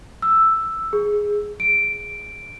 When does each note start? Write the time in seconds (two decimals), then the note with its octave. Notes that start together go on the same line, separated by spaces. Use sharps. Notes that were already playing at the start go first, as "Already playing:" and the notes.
0.22 E6
0.93 G#4
1.60 D7